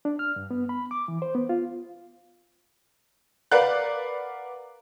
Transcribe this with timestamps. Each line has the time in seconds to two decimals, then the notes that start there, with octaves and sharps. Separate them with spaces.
0.05 D4
0.19 F6
0.36 G2
0.51 B3
0.69 B5
0.91 D6
1.08 E3
1.22 C5
1.35 B3
1.49 F4
3.51 A#4 B4 D5 F5 F#5 F#6